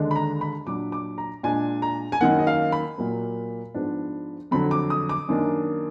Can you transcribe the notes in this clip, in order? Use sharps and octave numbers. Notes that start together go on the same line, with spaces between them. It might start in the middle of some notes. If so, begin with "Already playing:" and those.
Already playing: D#2 D3 G#3 D4
B5
A#5
B5
A#2 F#3 D4 D6
D6
A#5
A#2 G#3 D4 G#5
A#5
G#5
F#2 D#3 A#3 F#5
D#5
F5
B5
A#2 F#3 A#3
G#2 F3 B3 D4
F2 D3 F#3 B5
D6
D#6
D6
F#2 D#3 A#3 D4